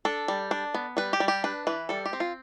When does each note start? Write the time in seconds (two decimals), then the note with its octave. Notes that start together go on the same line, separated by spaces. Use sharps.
0.05 D4 A4
0.28 G3
0.51 D4
0.74 B3
0.97 G3 B4
1.13 G4
1.20 G3
1.28 G4
1.44 D4 B4
1.67 E3 B4
1.89 G3 A4
2.06 G4
2.13 C4
2.20 F4